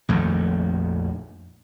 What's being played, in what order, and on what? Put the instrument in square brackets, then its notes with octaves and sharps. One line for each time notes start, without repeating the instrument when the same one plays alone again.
[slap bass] A#1 F2 D#3 A3